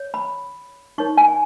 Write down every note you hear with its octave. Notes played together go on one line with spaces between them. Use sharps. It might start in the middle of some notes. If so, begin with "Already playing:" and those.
Already playing: C#5
B5
D#4 A#4 C#5 C#6
G#5